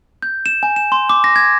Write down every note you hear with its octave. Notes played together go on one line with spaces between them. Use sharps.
G6
E7
G#5
E7
C6
D6
A#6
G#6